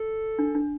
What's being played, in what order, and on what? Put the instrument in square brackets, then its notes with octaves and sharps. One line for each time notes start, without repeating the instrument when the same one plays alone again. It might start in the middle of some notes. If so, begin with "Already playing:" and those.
Already playing: [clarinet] A4
[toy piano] D4
D4